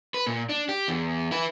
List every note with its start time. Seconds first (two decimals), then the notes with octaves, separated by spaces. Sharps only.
0.14 B4
0.26 A#2
0.49 D4
0.69 G4
0.88 E2
1.31 E4 B4